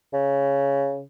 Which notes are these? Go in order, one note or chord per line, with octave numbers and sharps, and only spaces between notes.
C#3